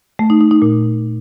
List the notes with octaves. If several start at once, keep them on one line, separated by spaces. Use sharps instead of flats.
A3
D#4
D#4
D#4
A#2